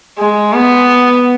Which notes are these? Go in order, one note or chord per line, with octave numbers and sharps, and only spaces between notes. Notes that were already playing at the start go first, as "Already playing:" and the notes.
G#3
B3